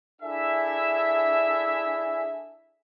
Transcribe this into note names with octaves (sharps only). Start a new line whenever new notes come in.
D4 E4 G#4 A4 E5